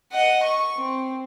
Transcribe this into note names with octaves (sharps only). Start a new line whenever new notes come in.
D#5 F#5
C#6
C4